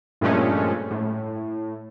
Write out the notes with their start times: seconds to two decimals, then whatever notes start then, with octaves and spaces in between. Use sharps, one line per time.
0.21 G2 A#2 F3 G#3 A3 C#4
0.91 A2